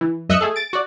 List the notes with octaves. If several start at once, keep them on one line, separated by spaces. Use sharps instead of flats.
E3
F#2 D#5 E5 E6 F#6 C#7
A3 G#4 A4
A6 D7
F#4 D5